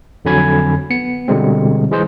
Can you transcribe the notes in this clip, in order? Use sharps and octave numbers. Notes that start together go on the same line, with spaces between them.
F2 D3 F#3 G#5 B5 G#6
B3 C#7
B2 D3 G3 G#3 C4
E3 G#3 G#4 C5